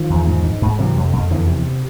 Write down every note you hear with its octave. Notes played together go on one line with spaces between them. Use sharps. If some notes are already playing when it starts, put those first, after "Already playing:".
Already playing: D#3 F3
E2
G#2
G#2
G#2
C3 E3 F#3
F2
F2
E2 D3 E3
C3